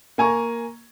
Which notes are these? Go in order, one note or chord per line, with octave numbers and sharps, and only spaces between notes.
A#3 G#5 A#5 C#6